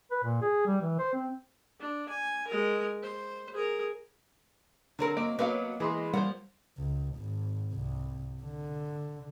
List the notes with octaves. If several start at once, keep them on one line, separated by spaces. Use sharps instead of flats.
B4
A#2
G#4
G3
E3
C5
C4
D4
G#5
G#3 A#4
C5
G#4 A#4
D3 F#3 C4 A#4
A#3 D#5 D7
F#3 A#3 B3 B4 F5
E3 G#3 B5 C6
F3 G3 A#3 C5 F#5
C#2
G#1
C2
D3